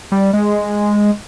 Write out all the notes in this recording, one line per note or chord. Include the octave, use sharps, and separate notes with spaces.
G3
G#3